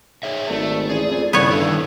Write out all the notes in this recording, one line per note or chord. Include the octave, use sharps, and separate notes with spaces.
G#4 C#5 E5
G#1 A3 D5
A1 G#4
F2
C2 G2 C#3 B3 C#5
G2 D3 D#3 E4 A4